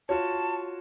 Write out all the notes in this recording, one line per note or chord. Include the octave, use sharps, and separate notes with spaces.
F4 F#4 C#5 A5